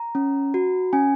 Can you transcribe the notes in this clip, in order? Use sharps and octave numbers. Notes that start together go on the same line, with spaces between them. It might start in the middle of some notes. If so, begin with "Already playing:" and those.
Already playing: A#5
C#4
F#4
C#4 G#5